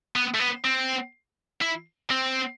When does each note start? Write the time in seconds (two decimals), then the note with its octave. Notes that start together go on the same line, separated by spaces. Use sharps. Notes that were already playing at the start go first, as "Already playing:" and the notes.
0.16 B3
0.34 A3
0.40 B3
0.65 C4
1.61 E4
2.11 C4